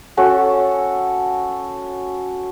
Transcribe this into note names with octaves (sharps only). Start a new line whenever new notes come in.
C#4 F#4 A4